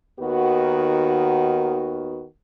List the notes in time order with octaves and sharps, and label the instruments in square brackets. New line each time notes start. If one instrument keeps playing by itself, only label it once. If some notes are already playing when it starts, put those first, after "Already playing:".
[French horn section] D#2 D#3 B3 F#4